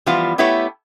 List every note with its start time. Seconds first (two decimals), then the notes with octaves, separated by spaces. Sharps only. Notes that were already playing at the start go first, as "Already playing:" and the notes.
0.06 E3 F3 G3 B3 F4
0.38 A3 B3 E4 G4 B4 C#5